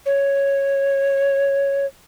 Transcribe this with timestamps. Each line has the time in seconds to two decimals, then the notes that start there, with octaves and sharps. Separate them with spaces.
0.06 C#5